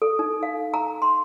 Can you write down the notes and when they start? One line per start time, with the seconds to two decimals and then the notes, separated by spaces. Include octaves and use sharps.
0.02 A4
0.19 D#4
0.43 F5
0.74 A#5
1.02 C6